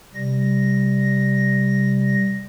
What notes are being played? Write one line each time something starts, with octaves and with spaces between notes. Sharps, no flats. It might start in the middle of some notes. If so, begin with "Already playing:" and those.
C3 G3 A#6